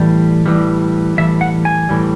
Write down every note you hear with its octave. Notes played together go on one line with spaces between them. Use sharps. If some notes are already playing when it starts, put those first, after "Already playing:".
Already playing: A2 E3 G3
A2 E3 G3
A2 E3 G3 E5
F#5
G#5
A2 E3 G3